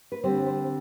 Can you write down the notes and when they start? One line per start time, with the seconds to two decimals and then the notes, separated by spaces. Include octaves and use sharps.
0.12 B4
0.24 D3 G3 C4 C5
0.46 C5